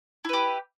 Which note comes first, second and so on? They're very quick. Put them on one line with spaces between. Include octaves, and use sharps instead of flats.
E4 B4 G4